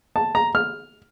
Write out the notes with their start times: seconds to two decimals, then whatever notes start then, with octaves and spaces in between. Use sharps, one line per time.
0.16 A5
0.35 A#5
0.55 F6